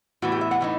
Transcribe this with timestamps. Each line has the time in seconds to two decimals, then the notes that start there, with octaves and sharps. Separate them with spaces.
0.22 A2 E3 B3 F#4
0.32 G4
0.41 E5
0.51 F#5
0.61 A2 E3 D#4